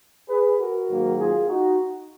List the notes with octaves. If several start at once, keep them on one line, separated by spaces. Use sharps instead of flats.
G#4 B4
F#4 A#4
G#2 D#3 F#3 A#3
F4 G#4
D#4 F#4